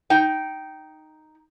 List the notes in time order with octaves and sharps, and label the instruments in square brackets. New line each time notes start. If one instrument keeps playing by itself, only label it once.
[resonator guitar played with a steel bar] D#4 G5